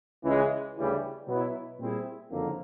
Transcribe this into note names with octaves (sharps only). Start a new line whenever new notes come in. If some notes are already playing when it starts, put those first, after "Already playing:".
C#2 C#3 E3 G#3
D2 C#3 E3 G3
B2 F#3 B3 E4
A#2 G3 C4 E4 G#4
F#1 F2 D3 F3 A#3